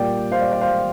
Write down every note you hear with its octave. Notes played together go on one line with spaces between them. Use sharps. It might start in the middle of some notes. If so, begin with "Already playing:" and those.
Already playing: A#2 G3 A#3 D5 G5
C5 F5
D5
D5
C5 F5